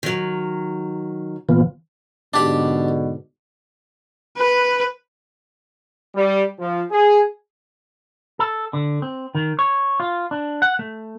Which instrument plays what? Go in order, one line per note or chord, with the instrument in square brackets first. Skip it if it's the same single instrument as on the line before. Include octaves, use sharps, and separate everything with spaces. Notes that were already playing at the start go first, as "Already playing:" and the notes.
[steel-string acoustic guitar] D#3 F#3
[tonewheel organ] A#2 B3 F4 [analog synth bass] E3
[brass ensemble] G#2 B2 D3 [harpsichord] D4 G4
[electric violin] B4
[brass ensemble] G3
F3
G#4
[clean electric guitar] A4
D3
C4
D#3
C#5
F4
D4
F#5
A3